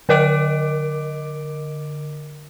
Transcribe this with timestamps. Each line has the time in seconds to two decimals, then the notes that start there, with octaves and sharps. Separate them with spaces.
0.09 D3 A#4 D#5 D6 D7